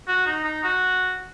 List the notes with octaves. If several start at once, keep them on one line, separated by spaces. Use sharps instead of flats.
F#4
D#4
D#4
F#4